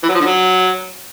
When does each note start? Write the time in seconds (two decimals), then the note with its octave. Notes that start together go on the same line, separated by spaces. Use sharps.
0.03 E3
0.09 F#3
0.14 F3
0.20 D3
0.26 F#3